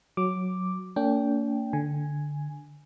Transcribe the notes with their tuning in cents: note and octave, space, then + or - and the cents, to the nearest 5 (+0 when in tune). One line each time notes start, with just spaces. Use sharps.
F#3 -5 D6 +0
A#3 -35 D4 -45 G5 +0
D3 +0 G#5 +0